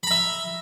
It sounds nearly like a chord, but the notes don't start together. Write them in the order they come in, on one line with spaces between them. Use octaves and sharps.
B5 A#5 E5